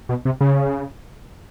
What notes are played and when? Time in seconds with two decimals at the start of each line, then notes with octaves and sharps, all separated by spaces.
0.09 B2
0.25 C3
0.41 C#3